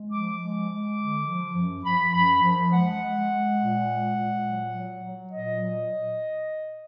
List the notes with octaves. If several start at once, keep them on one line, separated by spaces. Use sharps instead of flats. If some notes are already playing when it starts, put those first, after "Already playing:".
Already playing: G#3
F3 D6
G#3
G#3
D3
F3
F#2
F3 B5
F#2 B5
F3
G#3 F#5
G#3
G#3
A#2
G#3
A#2
F#3
F#3
F#3
A#2 D#5
F#3